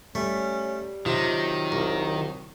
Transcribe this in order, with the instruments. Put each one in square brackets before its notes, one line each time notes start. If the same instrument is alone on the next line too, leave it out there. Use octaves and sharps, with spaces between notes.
[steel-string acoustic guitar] G3 [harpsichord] A3 [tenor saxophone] C#4
[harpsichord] C3 [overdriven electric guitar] D#3 [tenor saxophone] F#3 [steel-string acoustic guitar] F4
[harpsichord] C2